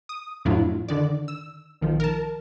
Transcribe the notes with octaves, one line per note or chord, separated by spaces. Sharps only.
D#6
F2 A2 F#3 D4 E4 F4
D3 D#3 D5
E6
B1 D#3 F3
A#4 A5